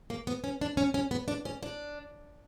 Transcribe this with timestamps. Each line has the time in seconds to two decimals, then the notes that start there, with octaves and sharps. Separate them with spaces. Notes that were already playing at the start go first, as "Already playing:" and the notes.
0.10 A#3
0.27 B3
0.44 C#4
0.61 D4
0.77 C#4
0.94 C#4
1.11 B3
1.28 D4
1.45 C#4
1.63 D4